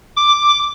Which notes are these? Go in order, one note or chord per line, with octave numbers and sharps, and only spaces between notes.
D6